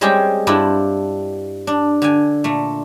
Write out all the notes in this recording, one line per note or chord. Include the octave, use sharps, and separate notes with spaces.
G3 G#3 C4 C#4 G4 G#4
G2 D4 E4 F4
D4
D3 G#5
A#2 A3